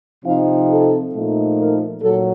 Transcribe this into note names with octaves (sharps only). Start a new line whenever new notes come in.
C3 F3 C4 D#4 F5
A4
A#2 F3 A3 D#4
A#4
A#2 F#3 A4